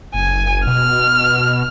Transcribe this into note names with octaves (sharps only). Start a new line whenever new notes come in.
F#1 G#5
B2 F6